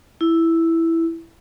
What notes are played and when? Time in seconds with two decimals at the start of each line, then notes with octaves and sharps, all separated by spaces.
0.21 E4